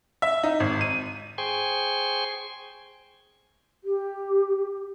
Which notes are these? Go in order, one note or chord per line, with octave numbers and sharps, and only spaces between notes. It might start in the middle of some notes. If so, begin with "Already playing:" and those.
E5
D#4
G#1
D#7
G#4 C5 G5 G#5 C6 C#6
G4